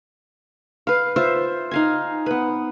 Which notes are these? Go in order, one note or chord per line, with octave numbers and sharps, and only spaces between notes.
B4 F5
F4 C5 E5
D#4 F5 G#5
B3 B4